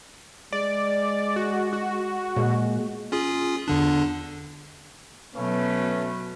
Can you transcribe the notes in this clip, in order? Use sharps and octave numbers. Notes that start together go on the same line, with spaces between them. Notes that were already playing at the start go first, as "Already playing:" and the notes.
G#3 D5
F#4
F#4
A#2 G#3
C#4 F4 G#4
E2 D3 D4
B2 F#3 A3 C#4 B4